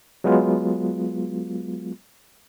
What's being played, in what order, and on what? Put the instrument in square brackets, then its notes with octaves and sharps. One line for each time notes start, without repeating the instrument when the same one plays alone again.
[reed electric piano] F#3 G#3 B3 F4